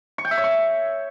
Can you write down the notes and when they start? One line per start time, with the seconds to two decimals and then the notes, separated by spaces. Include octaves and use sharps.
0.18 C#6
0.25 G5
0.31 E5
0.37 C#5
0.44 C#6